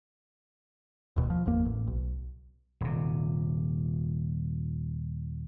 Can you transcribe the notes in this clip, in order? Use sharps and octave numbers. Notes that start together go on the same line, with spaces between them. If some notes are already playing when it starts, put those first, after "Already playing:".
D#1 D#2 B2
F3
G#1 E2 A#3
A1
B1
D#1 C3